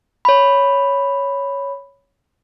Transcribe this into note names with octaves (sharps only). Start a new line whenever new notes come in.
C#5 B5